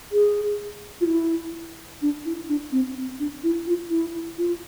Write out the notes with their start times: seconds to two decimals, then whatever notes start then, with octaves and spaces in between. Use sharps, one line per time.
0.12 G#4
1.01 F4
1.07 E4
2.02 D4
2.25 E4
2.49 D4
2.72 C4
2.96 C4
3.19 D4
3.44 E4
3.67 F4
3.91 E4
4.38 F4